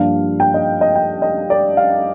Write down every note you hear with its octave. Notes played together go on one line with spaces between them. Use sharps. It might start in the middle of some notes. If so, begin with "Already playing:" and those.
Already playing: G2 F3 A#3 D4 F5
G5
D#5
D#5
G5
D#5
D5
F5